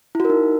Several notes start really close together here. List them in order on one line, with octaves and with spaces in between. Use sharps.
E4 F#4 A#4 D#4